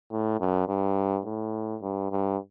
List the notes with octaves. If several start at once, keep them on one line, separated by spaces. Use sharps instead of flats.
A2
F#2
G2
A2
G2
G2